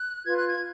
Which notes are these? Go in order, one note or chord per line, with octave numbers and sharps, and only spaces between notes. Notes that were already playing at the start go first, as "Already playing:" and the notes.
Already playing: F#6
F4 B4 G#6
F#6
G#6